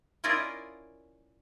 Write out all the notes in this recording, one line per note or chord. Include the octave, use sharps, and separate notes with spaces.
C#4 E4 F4 A#4 D5 D#5